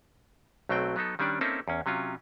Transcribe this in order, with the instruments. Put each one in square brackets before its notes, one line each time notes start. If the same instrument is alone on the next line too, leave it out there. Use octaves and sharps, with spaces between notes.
[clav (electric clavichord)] B1 F#3 A3 C4 G5
F#3 B3 D#4 A4
D#3 G3 C#4 D4 D5
A#3 C4 C#4 D#4 E4 A4
E2 C#4
C3 F#3 C#4 F4